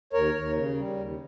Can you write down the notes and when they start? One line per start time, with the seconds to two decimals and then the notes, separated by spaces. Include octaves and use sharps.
0.13 D#2 A#4 C#5
0.34 D#2
0.55 C#3
0.77 G3
0.97 D#2